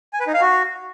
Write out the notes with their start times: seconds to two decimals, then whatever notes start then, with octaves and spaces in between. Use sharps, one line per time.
0.13 G#5
0.20 B4
0.27 D#4
0.34 F5
0.41 F#4